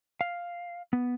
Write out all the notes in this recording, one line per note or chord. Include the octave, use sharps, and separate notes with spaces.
F5
B3